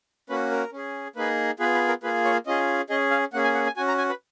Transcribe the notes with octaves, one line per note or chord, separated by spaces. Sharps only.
A#3 C#4 F#4 B4
A#4
C#4 G#4
A#3 D#4 G#4 B4
B3 F4 G#4 B4
B4
A#4
A#3 F4 G#4 B4
C#5
C#4 F4 G#4 D#5
C#4 G#4 D#5
F5
A#3 C#4 G#4 F#5
G#5
F#5
G#5
C#4 F#4 G#5
A#5
G#5
B4